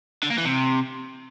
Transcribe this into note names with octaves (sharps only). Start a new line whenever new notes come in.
D3
A#3
E3
C3